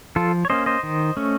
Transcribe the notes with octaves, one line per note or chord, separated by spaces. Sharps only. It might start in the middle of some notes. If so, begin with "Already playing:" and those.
F3 F4 A4
C#5
A#3 C#4 C5 D#5
C5 D#5
D#3
A3 C#4